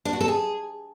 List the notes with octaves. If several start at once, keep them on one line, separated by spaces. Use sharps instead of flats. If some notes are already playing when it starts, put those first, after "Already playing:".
D4
F#4
A4
G#4